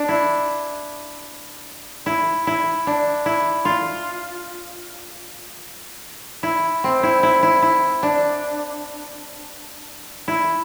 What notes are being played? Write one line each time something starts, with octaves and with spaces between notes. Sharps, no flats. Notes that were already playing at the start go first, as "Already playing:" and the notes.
Already playing: D4
E4
E4
E4
D4
E4
F4
E4
C4
E4
E4
E4
E4
D4
E4